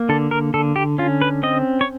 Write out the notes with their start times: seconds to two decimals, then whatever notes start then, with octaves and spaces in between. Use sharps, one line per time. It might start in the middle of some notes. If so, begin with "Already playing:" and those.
Already playing: A#3
0.09 D3 A4
0.31 A#4
0.54 D3 A4
0.76 G4
0.98 C#4 F4
1.21 B4
1.43 C4 D#5
1.81 C#5